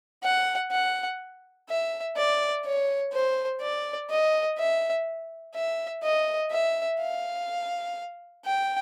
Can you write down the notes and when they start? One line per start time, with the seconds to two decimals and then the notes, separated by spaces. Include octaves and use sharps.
0.23 F#5
0.71 F#5
1.69 E5
2.17 D5
2.65 C#5
3.13 C5
3.61 D5
4.10 D#5
4.58 E5
5.55 E5
6.03 D#5
6.51 E5
7.00 F5
8.45 G5